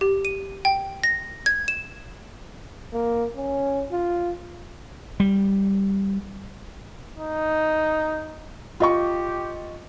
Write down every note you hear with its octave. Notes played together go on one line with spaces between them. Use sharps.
G4
D#7
G5
A#6
G#6
E7
A#3
C#4
F4
G3
D#4
F4 G4 D#5 C#6